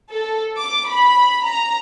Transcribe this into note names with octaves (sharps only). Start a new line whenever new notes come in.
A4
D6
B5
A#5